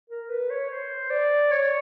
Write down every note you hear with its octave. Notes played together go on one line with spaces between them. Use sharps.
A#4
B4
C#5
C5
D5
C#5